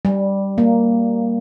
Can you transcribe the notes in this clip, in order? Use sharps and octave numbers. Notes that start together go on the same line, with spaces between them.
G3
A#3